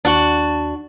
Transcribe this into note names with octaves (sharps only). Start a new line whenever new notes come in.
D#2 D4 F#4